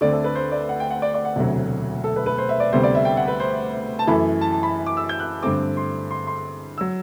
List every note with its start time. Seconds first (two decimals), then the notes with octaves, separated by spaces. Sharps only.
0.01 D2 D3 A3 C4 D5
0.13 A4
0.24 B4
0.35 C5
0.52 D5
0.69 F#5
0.80 G5
0.91 F#5
1.02 D5
1.14 D5
1.25 F#5
1.36 E1 D2 C3 F#3
2.04 A4
2.16 B4
2.26 B4
2.38 C5
2.49 E5
2.60 D5
2.73 D2 C3 G3 B3 C5
2.83 D5
2.95 E5
3.05 G5
3.17 F#5
3.28 B4
3.40 C5
3.99 A5
4.07 F#2 E3 A3 B5
4.41 A5
4.52 A5
4.63 B5
4.87 D6
4.97 E6
5.09 G6
5.20 F#6
5.43 G2 D3 A3 C4 D6
5.77 C6
6.11 C6
6.27 C6
6.78 F#3 E6